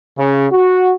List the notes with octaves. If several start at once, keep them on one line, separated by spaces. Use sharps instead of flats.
C#3
F#4